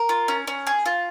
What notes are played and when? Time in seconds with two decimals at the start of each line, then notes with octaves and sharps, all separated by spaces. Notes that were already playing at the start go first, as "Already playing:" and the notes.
Already playing: A#4
0.09 F4
0.28 C#4
0.47 C#4
0.67 G#4
0.86 F4